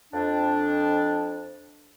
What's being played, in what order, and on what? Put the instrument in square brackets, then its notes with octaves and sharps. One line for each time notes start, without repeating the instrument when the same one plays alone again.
[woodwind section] F2 D4